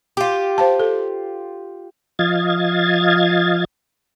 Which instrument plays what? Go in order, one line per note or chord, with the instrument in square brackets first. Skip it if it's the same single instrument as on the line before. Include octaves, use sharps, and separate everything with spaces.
[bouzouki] F4 G4
[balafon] C5 F5 A5
A4
[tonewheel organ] F3 D#5 F5 G#6 A6